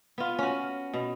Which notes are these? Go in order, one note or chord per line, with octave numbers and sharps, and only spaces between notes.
B3 F4
C#4 F#4
B2